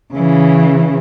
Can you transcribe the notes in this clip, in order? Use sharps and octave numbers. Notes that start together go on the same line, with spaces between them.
C#3 E3